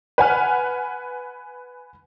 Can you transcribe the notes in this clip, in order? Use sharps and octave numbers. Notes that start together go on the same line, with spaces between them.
B4 F#5 G#5 F6